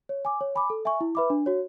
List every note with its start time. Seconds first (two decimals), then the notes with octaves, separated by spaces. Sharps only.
0.09 C#5
0.25 G#5 D6
0.41 C#5
0.55 G#5 B5 D6
0.70 A4
0.85 E5 G#5 C#6
1.01 E4
1.15 B4 E5 B5 D6
1.30 D4
1.46 F#4 C#5